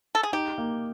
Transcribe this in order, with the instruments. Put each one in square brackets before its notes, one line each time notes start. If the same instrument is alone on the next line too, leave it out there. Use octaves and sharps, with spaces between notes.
[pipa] A4
G#4
[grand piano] D#4 [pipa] G4
[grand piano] A#3